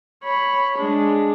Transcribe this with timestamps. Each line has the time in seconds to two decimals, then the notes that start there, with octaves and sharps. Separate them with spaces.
0.24 C#5 B5
0.78 G#3 D4